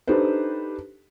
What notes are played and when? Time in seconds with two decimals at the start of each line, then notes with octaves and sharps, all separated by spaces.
0.07 D4 D#4 G4 A4 B4 C5